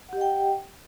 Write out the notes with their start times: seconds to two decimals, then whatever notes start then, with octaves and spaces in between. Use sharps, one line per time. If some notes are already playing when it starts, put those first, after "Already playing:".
0.09 F#5
0.13 G4
0.17 D#5
0.21 G5